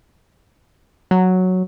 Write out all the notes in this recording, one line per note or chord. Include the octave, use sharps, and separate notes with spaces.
F#3